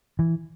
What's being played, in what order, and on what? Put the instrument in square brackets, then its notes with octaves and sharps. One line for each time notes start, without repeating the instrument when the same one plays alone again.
[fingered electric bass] E3